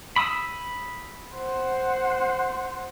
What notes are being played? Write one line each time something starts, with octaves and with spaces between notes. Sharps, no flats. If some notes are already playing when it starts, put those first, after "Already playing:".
B5 D#6 E6
C5 F#5